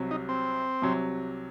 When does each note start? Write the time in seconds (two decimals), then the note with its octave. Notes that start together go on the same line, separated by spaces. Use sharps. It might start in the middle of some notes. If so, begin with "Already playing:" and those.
Already playing: C2 C3 F#3
0.11 D#4
0.29 C4
0.82 C2 C3 F#3